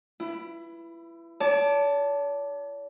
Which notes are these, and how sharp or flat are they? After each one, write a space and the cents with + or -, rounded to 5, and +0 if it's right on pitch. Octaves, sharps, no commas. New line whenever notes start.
E4 +25 B4 +0
C#5 +45 A5 +0 D6 +0